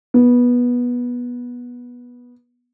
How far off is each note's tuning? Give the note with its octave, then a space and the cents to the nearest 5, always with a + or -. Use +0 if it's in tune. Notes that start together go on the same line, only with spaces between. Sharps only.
B3 -15